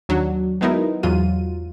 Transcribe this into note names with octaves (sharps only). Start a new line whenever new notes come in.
D#2 F#3 D4
F#3 G#3 B3 D#4 E4 A#4
E2 G#2 F#3 F4 D#7